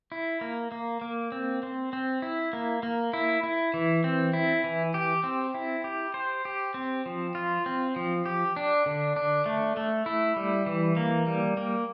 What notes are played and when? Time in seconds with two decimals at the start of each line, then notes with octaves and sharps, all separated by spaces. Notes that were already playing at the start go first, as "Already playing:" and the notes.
0.12 E4
0.41 A#3
0.72 A#3
1.01 A#3
1.32 C4
1.63 C4
1.93 C4
2.22 E4
2.53 A#3
2.83 A#3
3.13 E4
3.44 E4
3.74 E3
4.04 C4
4.33 E4
4.64 E3
4.94 G4
5.24 C4
5.54 E4
5.84 G4
6.14 C5
6.45 G4
6.74 C4
7.06 F3
7.35 F4
7.66 C4
7.96 F3
8.26 G4
8.56 D4
8.86 D3
9.16 D4
9.46 A3
9.77 A3
10.06 E4
10.36 G3
10.66 E3
10.97 A#3
11.27 G3
11.57 A#3